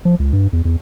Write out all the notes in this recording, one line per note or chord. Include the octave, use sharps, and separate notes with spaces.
F3
C#2
G2
E2
E2